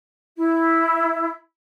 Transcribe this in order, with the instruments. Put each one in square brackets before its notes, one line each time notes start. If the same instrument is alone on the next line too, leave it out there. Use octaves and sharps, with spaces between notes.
[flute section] E4